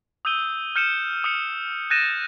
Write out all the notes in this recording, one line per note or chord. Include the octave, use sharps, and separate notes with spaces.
D#6 E6 G6 D#7 G7
F6 G6 C#7 D#7 E7
D#6 F6 C#7
F#6 G6 A6 A#6 D#7 E7